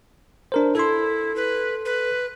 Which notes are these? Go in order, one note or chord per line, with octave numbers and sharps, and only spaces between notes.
D4 A#4 C5
E4 A4 C6
B4
B4